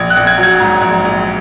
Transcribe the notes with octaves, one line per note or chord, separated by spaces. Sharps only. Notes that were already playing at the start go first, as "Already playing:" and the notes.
Already playing: A#1 G#6
F#6
A#1
G#6
F#3
G#6
G#2
A#1
A#1